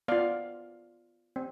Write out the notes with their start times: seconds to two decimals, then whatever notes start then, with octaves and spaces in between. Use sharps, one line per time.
0.08 B3 F4 D5 F5
1.36 C4